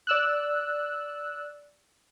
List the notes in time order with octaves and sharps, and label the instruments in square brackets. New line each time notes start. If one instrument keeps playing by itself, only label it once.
[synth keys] D5 E6 F#6